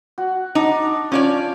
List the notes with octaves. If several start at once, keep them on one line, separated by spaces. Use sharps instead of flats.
F#4
D4 D#4
F3 C#4 C#5 D5